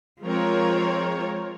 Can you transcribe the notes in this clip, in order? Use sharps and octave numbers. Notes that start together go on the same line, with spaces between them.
F3 G#3 C4 F4 A#4 C#5